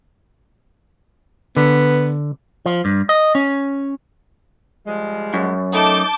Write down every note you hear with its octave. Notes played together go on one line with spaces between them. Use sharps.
D3 B3
F3
G2
D#5
C#4
F3 G3 G#3
F#2
A3 D#4 A5 D6 G6